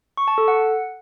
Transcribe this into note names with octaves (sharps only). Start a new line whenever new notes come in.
C#6
A5
A4
F#5